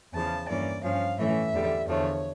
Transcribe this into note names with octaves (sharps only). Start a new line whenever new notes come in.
E2 C#3 F3 A5
G2 E3 A#3 C#4 D5
G2 F3 C#4 F5
A2 E3 A3 C#4 E5
E2 D3 G3
E2 D3 F3 A3 C#5